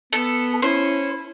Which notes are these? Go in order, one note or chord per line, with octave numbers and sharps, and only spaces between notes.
B3 A4
C#4 E4 C5